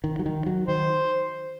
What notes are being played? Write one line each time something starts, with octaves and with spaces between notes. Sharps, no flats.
D#3
F#3
D#3
F#3
D#3 C5